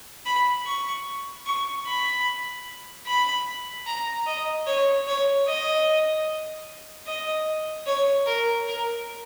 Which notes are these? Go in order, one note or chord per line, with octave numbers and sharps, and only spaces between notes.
B5
C#6
C#6
B5
B5
A#5
D#5
C#5
C#5
D#5
D#5
C#5
A#4
A#4